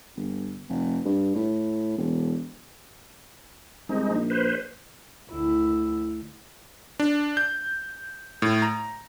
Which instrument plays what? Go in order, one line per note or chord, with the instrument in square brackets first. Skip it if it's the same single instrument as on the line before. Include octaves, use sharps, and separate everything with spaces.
[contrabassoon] G1
F1
G2
A2
E1
[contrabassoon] C2 [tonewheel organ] G#3 D#4
[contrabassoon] A#1
[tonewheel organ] B4 C5
[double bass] D2 E4
[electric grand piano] D4
G6
A2
A#5